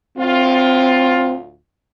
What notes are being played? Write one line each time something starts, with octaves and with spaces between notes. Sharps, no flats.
D2 A2 C4 F4